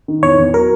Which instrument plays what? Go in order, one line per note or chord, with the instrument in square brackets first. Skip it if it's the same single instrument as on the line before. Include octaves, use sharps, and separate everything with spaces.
[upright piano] D#3
[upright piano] E2 [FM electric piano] C#5
[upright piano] E2
[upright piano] F#3 [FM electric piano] A#4